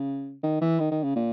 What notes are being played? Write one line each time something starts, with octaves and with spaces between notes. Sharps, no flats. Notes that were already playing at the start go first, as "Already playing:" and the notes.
Already playing: C#3
D#3
E3
D#3
D#3
C#3
A#2